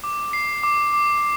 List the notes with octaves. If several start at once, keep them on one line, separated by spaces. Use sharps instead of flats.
D6
C7
D6
D6